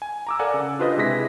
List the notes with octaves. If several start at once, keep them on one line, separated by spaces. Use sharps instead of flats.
G#5
A#5 D6 E6
A4 A#4 D5 F5 F#5 G#5
C#3
D4 F4 G4 B4 C5 D#5
C3 G#3 E4 G#4 A#6 B6